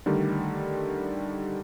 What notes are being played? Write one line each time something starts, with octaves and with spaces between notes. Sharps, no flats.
D3 D#3 G3 A3